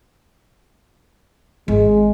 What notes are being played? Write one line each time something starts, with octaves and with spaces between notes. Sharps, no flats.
G#1 G#3